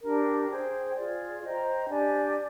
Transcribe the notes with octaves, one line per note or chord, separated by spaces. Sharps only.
D4 G4 A#4
G#4 C5 G5
F4 G#4 D5
C5 D#5 G5 A#5
D4 G4 D5 G#5